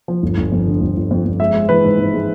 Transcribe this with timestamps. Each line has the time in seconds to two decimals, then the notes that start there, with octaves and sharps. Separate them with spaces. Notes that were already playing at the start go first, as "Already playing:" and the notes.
0.08 F3
0.23 G1
0.38 G1
0.52 F2
0.67 D3
0.81 G1
0.97 G1
1.11 F2
1.25 F2
1.40 G#3 E5
1.54 G#3
1.69 E3 B4
1.84 G#2
1.99 G#2
2.14 G#3